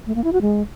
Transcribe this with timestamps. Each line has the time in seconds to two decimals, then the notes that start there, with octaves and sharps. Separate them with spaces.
0.07 A3
0.15 A#3
0.24 E4
0.33 F#4
0.41 G#3